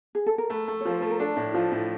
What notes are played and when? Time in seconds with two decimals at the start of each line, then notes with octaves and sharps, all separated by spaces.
0.15 G#4
0.27 A4
0.38 A#4
0.50 A3 B4
0.68 A3
0.81 C#5
0.85 F3
0.90 C5
1.00 A3 B4
1.10 A#4
1.20 D4 A4
1.36 A2 E4
1.54 F3 F4
1.72 A2 E4